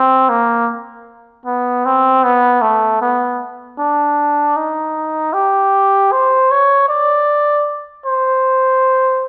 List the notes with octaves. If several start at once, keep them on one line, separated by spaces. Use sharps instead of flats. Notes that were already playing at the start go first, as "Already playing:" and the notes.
Already playing: C4
A#3
B3
C4
B3
A3
B3
D4
D#4
G4
C5
C#5
D5
C5